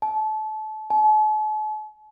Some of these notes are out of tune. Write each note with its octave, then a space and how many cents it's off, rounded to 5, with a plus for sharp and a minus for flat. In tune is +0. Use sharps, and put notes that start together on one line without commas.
A5 -30
A5 -45